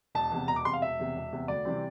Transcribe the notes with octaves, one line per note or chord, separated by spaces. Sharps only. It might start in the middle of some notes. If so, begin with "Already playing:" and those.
E1 A5
E2 C3
E1 A#5
D6
E2 C3 C6
F5
E1 E5
E2 C3
E1
E2 C3
D2 D5
C3 E3 G3 C4